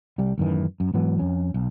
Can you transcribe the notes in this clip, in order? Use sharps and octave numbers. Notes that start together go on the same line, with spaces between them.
C2 G3
A1 F#2 D#3 E3
F#2
G#2 E3 F#3 B3
F2 C#4
B1